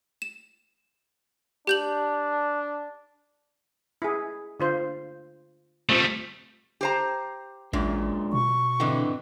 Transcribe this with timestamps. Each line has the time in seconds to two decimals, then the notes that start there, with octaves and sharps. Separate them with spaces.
0.22 E7
1.67 D4 G4 G6 F#7
4.02 E4 G#4
4.60 D3 F4 C5
5.89 F3 G3 A3 C4
6.81 G4 C5 A#5
7.73 A1 F#2 A#2 G#3 D4
8.33 B2 C#6
8.80 D3 E3 C4 D#5 G5